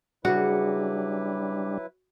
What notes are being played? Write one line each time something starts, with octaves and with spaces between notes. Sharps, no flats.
C#3 F#3 G3 D4 E4 F#4 G#4 B4